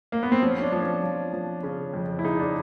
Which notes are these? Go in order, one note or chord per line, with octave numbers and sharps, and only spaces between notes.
A#3
B3
C4
F3 C#4
C#4
D4
F3
C#4
F3
F3
C#3 C#4
F2
E4
C#3 D#4
D4